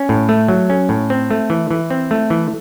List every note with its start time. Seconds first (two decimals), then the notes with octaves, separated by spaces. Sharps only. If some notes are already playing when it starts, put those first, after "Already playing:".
Already playing: C#4
0.09 A2
0.29 A3
0.48 F#3
0.70 C#4
0.89 A2
1.10 C4
1.31 A3
1.50 E3
1.71 E3
1.90 C4
2.11 A3
2.30 E3